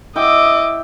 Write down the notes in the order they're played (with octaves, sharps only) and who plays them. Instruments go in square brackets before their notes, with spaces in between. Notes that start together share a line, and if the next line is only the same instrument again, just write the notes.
[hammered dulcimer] E4 G5 [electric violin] D#5 D6